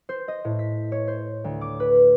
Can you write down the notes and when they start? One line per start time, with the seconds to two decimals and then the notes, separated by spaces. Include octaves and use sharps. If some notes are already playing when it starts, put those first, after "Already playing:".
0.09 C5
0.28 D#5
0.45 A2
0.59 B6
0.92 C#5
1.08 C5
1.44 D2
1.61 D6
1.80 B4